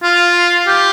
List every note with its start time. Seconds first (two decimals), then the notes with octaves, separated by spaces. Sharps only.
0.03 F4
0.67 G4